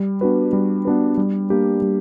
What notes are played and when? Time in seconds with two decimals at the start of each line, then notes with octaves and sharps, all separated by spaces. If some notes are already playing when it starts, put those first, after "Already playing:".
Already playing: G3
0.21 B3 D4 F#4 B4
0.53 G3
0.85 B3 D4 F#4 B4
1.17 G3
1.50 A#3 D4 G4
1.82 G3